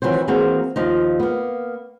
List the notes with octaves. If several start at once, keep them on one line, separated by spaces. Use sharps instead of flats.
D#3 E3 F#3 C4 C5
E3 A#3 C4 F#4 G#4 C5
D#2 F3 D#4
A#3 B3